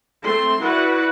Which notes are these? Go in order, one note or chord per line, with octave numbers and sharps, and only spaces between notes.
A3 C4 C6
E4 F#4 B4 D5 F#5